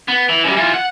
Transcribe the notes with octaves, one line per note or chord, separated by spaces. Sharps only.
B3
E3
F#2 G3
E3 F4
F#5